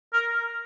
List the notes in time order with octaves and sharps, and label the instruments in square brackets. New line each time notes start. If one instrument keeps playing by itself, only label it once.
[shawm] A#4